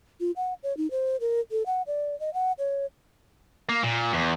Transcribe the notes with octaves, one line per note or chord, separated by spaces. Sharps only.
F4
F#5
C#5
D#4
C5
A#4
A4
F#5
D5
D#5
F#5
C#5
A#3
A#2
E2